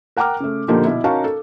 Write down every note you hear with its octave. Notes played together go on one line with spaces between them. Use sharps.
A#4 F#5 G5 A#5 D6 F6
C#3 A3
A#2 D3 F3 A#3 D#4 G4
B2 E4
C#4 D#4 F#4 A#4 F5 A5
A4